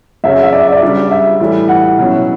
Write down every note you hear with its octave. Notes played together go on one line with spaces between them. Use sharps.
F#2 C#3 F#3 C#4 E5
E5
D5
E5
D5
C#3 G3 D4
E5
A2 E3 G3
F#5
B2 F#3 C#4 E4